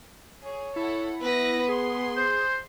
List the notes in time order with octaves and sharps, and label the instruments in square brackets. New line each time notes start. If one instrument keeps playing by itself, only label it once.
[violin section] G#4 [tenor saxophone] C#5
[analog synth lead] E4 [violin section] A4 F#5
[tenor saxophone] B3 [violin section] B4 A#6
[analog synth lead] G#4 [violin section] C6
[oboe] C5